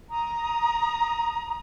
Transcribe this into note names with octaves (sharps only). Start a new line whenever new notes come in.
A#5 D#6